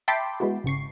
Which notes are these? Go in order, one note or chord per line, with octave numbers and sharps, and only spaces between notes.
E5 G5 A5 B5 C6 D6
G#3 B3 E4 F#4
G#1 C#3 C#6 C7